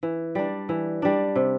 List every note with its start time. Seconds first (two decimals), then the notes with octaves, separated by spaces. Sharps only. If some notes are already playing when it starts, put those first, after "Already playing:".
0.03 E3
0.35 G3 D4
0.69 E3
1.02 G3 D4
1.36 C3